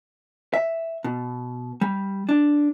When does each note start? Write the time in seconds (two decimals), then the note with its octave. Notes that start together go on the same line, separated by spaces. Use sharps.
0.54 E5
1.04 B2
1.81 G3
2.29 D4